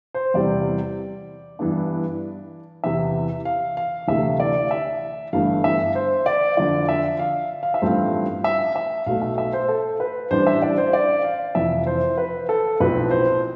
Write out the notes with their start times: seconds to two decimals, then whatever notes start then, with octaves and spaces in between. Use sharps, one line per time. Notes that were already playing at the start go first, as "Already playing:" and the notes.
0.14 C5
0.34 E2 C3 G3 C4 D5
1.59 G2 E3 B3 D4
2.84 E2 C3 E3 E5
3.45 F5
3.77 F5
4.08 D2 C3 E3 A3 E5
4.40 D5
4.71 E5
5.33 G1 G2 E3 A3 F5
5.64 E5
5.95 C5
6.26 D5
6.57 F2 D3 F3 D5
6.89 E5
7.19 F5
7.63 F5
7.74 E5
7.82 A1 G2 F3 A3 C4 F5
8.44 E5
8.76 E5
9.06 B1 B2 A3 F5
9.22 E5
9.38 E5
9.53 C5
9.68 A4
10.00 B4
10.31 A1 A2 G3 D4 C5
10.47 E5
10.62 D5
10.77 C5
10.93 D5
11.24 F5
11.55 F1 F2 E3 E5
11.87 C5
12.18 B4
12.49 A4
12.80 B1 A2 F3 C4 B4
13.11 C5